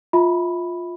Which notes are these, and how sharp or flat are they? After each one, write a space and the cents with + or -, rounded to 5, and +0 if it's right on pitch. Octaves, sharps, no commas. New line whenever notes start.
F4 +10 E5 -30 B5 +0